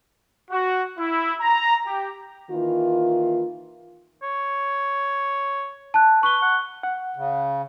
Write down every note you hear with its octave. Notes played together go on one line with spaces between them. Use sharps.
F#4
E4
A#5
G4
D#3 E3 A#3 E4 F4
C#5
A5 F#6
B4 C#6 G7
F#5
F#5
C#3